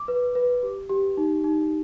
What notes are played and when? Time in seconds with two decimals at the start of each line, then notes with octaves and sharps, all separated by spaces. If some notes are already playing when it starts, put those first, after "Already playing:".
Already playing: D6
0.08 B4
0.35 B4
0.63 G4
0.90 G4
1.17 D#4
1.44 D#4